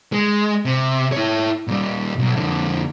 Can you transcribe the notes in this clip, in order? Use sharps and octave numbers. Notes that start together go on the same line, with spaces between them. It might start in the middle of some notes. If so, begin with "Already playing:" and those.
G#3
C3
E4 C#5
A#2 G3
B1
F2 D3